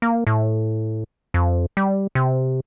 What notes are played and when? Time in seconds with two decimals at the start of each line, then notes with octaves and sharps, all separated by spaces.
0.02 A#3
0.27 A2
1.34 F2
1.77 G3
2.15 C3